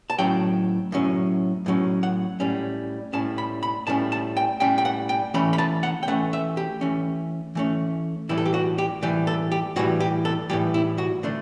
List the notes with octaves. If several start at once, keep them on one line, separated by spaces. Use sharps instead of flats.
A5
A2 F#3 C#4 G5
A2 F#3 C#4
A2 F#3 C#4
F#5
A2 G3 C#4
A2 G3 C#4 A5
B5
B5
A2 G3 C#4 A5
A5
G5
A2 G3 C#4 G5
G5
F#5
G5
E3 A3 C#4 B5
B5
A5
F#5
G5
E3 A3 C#4 F#5
E5
G4
E3 A3 C#4
E3 A3 C#4
A2 E3 G3 E4
A4
G4
F#4
G4
A2 E3 G3 G4
A4
G4
A2 E3 G3 F#4
G4
A4
A2 E3 G3 G4
E4
F#4
D3 A3 D4